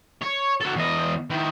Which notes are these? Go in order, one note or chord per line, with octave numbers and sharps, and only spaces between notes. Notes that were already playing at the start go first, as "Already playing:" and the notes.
C#5
F#4 A4
E2 D#5
D#3 E4